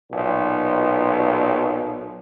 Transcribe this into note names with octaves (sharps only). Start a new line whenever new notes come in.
B1 A#2